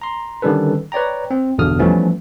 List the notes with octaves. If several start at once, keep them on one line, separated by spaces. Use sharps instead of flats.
A#5 C6
D3 D#3 G3 C#4 A4 B4
B4 C#5 D5 G5 A#5
C4
G1 E2 B2 D3 D#6 F6
E3 F3 G3 A3 B3 C#4